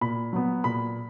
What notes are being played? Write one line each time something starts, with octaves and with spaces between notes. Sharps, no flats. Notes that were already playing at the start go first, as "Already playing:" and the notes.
A#2 B5
F#3 B3
A#2 B5